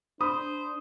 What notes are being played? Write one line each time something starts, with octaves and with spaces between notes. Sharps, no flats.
D4 C5 B5 D#6